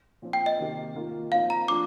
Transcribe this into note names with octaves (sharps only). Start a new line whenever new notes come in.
A#2 F3 C4 F4
G5
D#5
C3 D#3 A#3
D#3 A#3 F4
A#2 F3 C4 D#4 F5
A#5
F3 A#3 D4 F4 D6